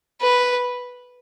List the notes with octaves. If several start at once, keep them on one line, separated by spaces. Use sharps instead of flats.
B4